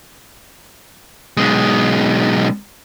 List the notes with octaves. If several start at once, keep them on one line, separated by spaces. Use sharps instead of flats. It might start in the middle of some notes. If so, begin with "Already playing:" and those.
B1 G#3